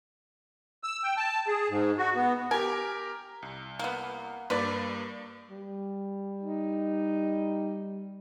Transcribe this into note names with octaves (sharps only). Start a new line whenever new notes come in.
E6
G5
A5
G#4
G#2
F#4
B3
G4 A#4 G#5
C2
A#3 B3
G2 A#3 B4 D5
G3
D#4